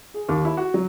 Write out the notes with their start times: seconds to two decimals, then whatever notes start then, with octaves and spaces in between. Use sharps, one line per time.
0.14 G#4
0.29 D#2
0.45 E4
0.57 F#4
0.74 F#3